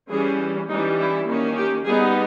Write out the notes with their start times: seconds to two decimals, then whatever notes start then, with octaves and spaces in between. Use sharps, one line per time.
0.10 E3 G3 C#4 G#4
0.69 E3 G3 C#4 D#4
0.98 E4
1.28 D#3 A#3 C#4
1.57 G4
1.86 G3 B3 D#4 G#4